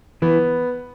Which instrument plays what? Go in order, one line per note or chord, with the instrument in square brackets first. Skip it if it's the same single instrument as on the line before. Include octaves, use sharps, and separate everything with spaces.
[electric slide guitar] E3 [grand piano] B3